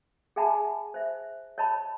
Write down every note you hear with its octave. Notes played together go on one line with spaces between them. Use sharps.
G#4 E5 F#5 G#5 A5 B5
C5 E5
C#5 D#5 A5 B5